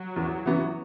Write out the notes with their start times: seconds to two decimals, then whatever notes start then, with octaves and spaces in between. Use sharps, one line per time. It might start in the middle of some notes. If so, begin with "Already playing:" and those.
Already playing: F#3
0.16 E2
0.46 E3 B3 F#4